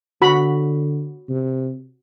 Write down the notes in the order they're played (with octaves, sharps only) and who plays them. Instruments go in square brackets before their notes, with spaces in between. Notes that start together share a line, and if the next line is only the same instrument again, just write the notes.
[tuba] D3 [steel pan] F#4 B5
[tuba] C3